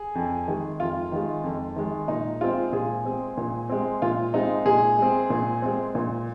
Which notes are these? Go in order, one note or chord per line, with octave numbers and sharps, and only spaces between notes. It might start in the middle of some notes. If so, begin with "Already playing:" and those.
Already playing: G#4
F2
D#3 G#3
F2 F4
D#3 G#3
F2
D#3 G#3
A#2 D#4
G#3 C4 F4
A#2 G#4
G#3 C4
A#2
G#3 C4
A#2 F4
G#3 C4 D#4
A#2 G#4
G#3 C4
A#2
G#3 C4
A#2